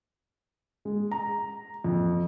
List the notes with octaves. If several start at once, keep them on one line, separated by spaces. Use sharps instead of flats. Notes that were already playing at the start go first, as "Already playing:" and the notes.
G#3
A#5
F2